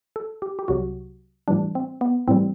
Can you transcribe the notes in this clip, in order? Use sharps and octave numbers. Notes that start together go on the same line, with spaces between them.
A4
G4
G4
C2 C3 F#3 F#4
A2 E3 G3 D4
C4
B3
A2 E3 G3 C4